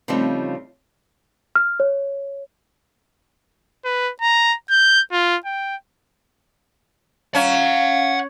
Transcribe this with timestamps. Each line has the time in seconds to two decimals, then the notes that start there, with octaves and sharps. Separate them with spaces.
0.08 C#3 F3 G3 A3 C4 D#4
1.55 F6
1.80 C#5
3.85 B4
4.22 A#5
4.70 G6
5.12 F4
5.45 G5
7.35 C#4 F5 F#5 A#5